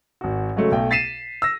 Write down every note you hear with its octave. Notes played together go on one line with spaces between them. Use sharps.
G#1 F#4
C#3 F#3 G#3 A3
B1 A3 G5
A6 B6 C7 D#7 E7
E6 A#6